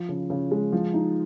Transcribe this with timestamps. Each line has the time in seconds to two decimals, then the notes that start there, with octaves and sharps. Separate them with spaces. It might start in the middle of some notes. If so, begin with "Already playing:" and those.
Already playing: F3
0.09 C#3
0.30 C#3
0.51 G#3
0.73 F3
0.94 D#4